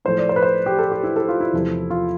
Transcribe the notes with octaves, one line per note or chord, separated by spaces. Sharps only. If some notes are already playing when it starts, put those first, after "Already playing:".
A2 F3 A3 C5
D5
C5
B4
C5
G4
A4
G4
E4
A4
F4
E4
E2 C3 F3 A3
F4